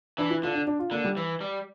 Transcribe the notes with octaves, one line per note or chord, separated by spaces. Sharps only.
E3 D4
E4
D3 F4
D4
D4
F4
D3 A#3
G3
E3
G3